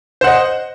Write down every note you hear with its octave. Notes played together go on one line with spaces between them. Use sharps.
C5 D#5 F#5